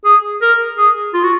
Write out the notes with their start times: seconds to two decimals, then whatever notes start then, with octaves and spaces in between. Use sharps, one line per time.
0.05 G#4
0.42 A#4
0.78 G#4
1.14 F4
1.24 F#4